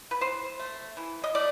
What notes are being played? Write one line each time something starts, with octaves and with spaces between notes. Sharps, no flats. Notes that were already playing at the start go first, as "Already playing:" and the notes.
B4
E3 C5
A3
E3
D#5
A3 D5